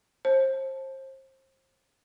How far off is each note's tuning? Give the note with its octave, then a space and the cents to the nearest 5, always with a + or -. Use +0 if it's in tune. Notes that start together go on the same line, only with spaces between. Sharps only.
C5 +30 A5 -10